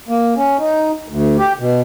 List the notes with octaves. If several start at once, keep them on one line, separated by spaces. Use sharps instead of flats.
A#3
C#4
D#4
D2
G4
B2